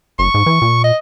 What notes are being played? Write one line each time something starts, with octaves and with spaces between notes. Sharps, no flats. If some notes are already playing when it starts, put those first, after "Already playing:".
F#1 C#6
G#2
E3
A#2
D#5